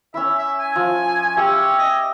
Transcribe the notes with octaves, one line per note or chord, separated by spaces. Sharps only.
C#4 E4 E5
E5
G#5
F3
C#4 G4 E5
D#5